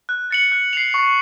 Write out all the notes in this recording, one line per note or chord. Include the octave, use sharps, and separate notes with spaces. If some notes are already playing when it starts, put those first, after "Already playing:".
F#6
A6 C#7 F#7
F#6
C7 F7
C#6